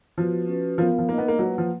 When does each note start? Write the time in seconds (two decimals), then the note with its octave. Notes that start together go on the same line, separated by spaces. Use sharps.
0.17 F3 B3 F#4 B4
0.48 C#4 F#4 B4
0.78 F3 B3 F4 A#4 F5
0.98 F3
1.08 A#3 D#4 A#4 D#5
1.18 B3
1.28 A#3
1.39 F#3 A#3 F4 B4 F#5
1.58 F3